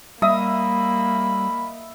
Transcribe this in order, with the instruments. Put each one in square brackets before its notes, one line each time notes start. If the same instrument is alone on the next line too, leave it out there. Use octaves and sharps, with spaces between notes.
[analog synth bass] G3 [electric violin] A#3 [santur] D#5 E5 D#6 [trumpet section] B5